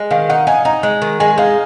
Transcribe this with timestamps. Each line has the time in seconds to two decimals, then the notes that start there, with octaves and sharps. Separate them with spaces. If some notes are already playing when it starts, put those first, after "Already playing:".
Already playing: G#3
0.11 D#3 F5
0.29 D#4 F#5
0.47 D#4 G#5
0.65 D#4 A#5
0.83 G#3
1.02 D#3
1.20 G#3 G#5
1.38 D#4 F5